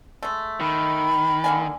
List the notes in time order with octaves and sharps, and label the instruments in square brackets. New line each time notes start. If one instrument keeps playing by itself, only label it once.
[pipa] G#3 A3
[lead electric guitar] D#3 [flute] B5
[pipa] D3 A#3 G#5